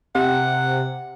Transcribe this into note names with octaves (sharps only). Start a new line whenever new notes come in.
C3 F#5